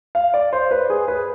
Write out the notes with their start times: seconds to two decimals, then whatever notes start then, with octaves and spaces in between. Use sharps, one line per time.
0.15 F5
0.34 D5
0.53 C5
0.71 B4
0.90 G#4
1.08 B4